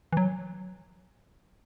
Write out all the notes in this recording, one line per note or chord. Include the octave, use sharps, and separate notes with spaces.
E3
F#3